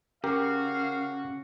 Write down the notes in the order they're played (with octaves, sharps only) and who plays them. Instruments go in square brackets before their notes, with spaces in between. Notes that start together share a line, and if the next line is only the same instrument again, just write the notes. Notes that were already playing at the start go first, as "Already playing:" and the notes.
[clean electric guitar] C#3 [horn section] A#3 F#4 [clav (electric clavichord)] G4 A#4 [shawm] F5